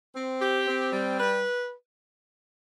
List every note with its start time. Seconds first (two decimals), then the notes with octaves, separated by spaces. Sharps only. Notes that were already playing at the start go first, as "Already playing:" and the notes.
0.15 C4
0.41 G4
0.67 C4
0.93 G3
1.19 B4